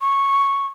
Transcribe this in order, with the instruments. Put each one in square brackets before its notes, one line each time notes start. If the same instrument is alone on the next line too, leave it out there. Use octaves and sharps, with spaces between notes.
[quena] C#6